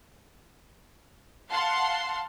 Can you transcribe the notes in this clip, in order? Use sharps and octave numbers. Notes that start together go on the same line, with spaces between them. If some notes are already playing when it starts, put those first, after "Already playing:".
F5 F#5 A5 C6